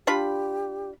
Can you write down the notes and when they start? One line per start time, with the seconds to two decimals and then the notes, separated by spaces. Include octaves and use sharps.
0.07 D4 F4 G4 B5